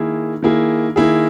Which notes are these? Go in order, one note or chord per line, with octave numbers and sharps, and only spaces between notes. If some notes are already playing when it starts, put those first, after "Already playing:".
Already playing: D#3 A#3 E4 G#4
D#3 A#3 E4 G#4
D#3 A#3 E4 G#4